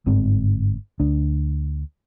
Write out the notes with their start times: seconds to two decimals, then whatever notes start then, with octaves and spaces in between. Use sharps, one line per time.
0.06 G1 G#2 C4
1.00 D2 D4